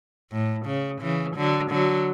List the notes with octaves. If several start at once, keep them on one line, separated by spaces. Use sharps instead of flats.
A2
C#3
C#3 E3
D3 F#3
D3 F#3